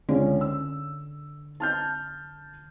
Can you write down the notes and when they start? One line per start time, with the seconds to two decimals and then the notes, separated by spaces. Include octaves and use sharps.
0.09 C#2 D3 C#4
0.41 E6
1.60 A5 F6 G6